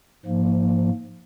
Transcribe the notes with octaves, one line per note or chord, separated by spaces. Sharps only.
G#2 F3 A#3